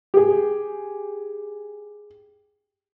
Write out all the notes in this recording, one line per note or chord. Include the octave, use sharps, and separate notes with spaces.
G4 G#4